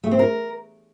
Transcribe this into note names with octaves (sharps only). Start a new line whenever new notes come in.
A3
C4
A#4